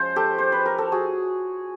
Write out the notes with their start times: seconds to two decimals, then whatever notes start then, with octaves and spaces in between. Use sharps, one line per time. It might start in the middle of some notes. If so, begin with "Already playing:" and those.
Already playing: F3 G#3 C#4 C5
0.16 G4 A4
0.38 C5
0.52 B4
0.66 A#4
0.78 A4
0.92 F#4 G#4